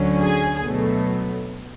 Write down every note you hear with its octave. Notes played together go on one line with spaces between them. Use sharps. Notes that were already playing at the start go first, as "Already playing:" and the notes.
Already playing: D2 D3 F#3 C#4
G#4
B2 F#3 A3